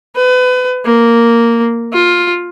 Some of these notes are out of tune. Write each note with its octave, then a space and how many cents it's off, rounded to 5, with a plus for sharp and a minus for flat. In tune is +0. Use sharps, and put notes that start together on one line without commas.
B4 +30
A#3 -5
F4 +10